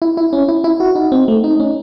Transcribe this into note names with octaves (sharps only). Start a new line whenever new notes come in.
E4
E4
C#4
E4
E4
F#4
D#4
C4
A3
D#4
C#4